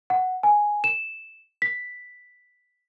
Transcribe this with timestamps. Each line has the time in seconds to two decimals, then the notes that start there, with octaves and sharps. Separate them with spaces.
0.10 F#5
0.43 G#5
0.84 E7
1.62 B6